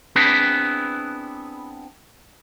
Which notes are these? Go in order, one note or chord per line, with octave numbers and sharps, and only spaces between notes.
B3 C4 D4 E4 G#4 B4